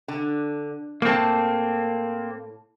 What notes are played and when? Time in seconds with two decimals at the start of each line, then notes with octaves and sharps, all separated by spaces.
0.08 D3
1.02 A2 A#3 C4 A5